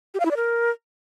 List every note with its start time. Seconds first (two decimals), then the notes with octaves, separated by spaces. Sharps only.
0.14 G4
0.20 F5
0.25 E4
0.31 D5
0.36 A#4